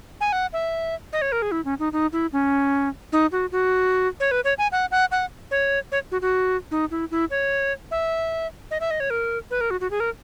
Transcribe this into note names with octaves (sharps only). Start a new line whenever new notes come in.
G#5
F#5
E5
D#5
C#5
A#4
G#4
E4
C#4
D#4
D#4
E4
C#4
D#4
F#4
F#4
C#5
B4
C#5
G#5
F#5
F#5
F#5
C#5
C#5
F#4
F#4
D#4
E4
E4
C#5
E5
D#5
E5
D#5
C#5
A#4
B4
A#4
F#4
F#4
G#4
A#4